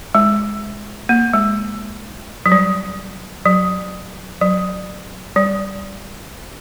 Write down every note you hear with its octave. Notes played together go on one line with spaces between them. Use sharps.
G#3
A#3
G#3
F#3
G3
F#3
F#3
G3